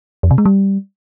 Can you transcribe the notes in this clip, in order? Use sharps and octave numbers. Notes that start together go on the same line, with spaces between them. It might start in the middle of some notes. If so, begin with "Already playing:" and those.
F2
C3
G#3
G3